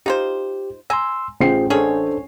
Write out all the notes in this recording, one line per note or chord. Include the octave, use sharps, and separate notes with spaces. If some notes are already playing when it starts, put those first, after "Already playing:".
D#4 F4 G4 C5
G#5 A#5 C6 E6
A1 F4 G#4 C5 G5 C7
C#4 D4 G#4 A4 C5 C#5